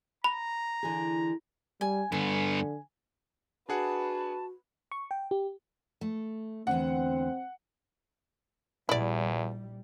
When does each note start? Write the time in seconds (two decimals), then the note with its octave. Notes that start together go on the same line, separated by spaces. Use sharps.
0.24 A#5 B5
0.83 D3 E3 G#4
1.81 G3 G#5
2.12 G2 D3 B3 G#5
3.69 D4 F#4 G#4 B4 F#5 A5
4.92 C#6
5.11 G5
5.31 G4
6.01 A3
6.67 E2 D3 C4 F#5
8.89 A#1 E2 G3 E4 D5